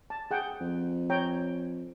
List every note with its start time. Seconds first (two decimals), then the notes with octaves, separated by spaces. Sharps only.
0.10 A5
0.31 G#4 F#5 G5
0.60 F2
1.10 C#5 G5 A#5